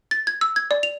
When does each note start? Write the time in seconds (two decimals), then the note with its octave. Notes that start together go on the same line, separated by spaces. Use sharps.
0.11 A6
0.27 G#6
0.41 E6
0.56 G#6
0.71 D5
0.83 F7